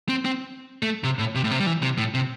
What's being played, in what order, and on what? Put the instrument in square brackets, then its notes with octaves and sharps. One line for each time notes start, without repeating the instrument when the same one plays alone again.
[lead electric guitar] C4
C4
A3
C3
A2
C3
A2
C3
G3
E3
C3
A2
C3